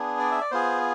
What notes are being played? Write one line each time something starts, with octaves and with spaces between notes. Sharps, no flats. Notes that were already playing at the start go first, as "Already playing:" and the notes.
Already playing: B3 D4 G#4
D5
E5
D5
B3 F4 G#4 C5